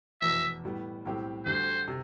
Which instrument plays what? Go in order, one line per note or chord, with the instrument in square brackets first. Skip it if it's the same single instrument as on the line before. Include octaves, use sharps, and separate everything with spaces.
[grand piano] F1 E2 B2 [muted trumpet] E5
[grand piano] A2 G3 B3
B1 A2 G3 C4 G4
[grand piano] D2 D3 G3 [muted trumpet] C5
[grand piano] C3